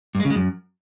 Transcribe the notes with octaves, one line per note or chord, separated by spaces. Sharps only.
G2
G#3
C#3
G#3
F#2